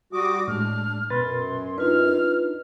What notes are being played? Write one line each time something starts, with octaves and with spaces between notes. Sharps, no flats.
G3 F#4 D6 D#6
A2 G#3 D4 F6
F#2 B2 B4 C6 A6
D4 D#4 F4 B4 F6